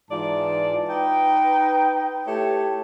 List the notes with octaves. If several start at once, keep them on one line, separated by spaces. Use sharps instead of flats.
G#2 E3 F4 D5 A5
D#4 B4 G5
A3 E4 G4 C#5 A5